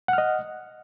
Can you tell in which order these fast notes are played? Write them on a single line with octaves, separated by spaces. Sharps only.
F#5 F6 D#5